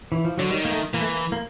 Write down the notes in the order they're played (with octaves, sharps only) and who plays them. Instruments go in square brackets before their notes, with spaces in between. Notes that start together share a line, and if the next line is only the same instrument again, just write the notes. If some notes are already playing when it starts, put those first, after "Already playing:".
[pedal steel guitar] E3
F3
[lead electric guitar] D3 [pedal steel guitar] F#3
[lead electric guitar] D#3 [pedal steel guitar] G3
[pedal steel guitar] A#3
A3
[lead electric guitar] E3 [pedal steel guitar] A#3
[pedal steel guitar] A3
A#3
A#3